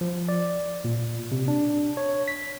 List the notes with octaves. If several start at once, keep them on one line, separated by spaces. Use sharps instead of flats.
F3
D5
A#2
C3
D4
C#5
B6